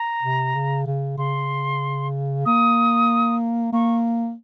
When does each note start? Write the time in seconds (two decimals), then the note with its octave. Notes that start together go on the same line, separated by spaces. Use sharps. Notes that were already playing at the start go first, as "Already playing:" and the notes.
Already playing: A#5
0.23 C3
0.55 C#3
0.87 C#3
1.18 C#3 C6
2.46 A#3 D#6
3.73 A#3 C#6